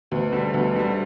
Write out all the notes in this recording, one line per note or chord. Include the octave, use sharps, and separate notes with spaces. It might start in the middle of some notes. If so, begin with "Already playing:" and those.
D2 B2
D3 G3
D2 B2
D3 G3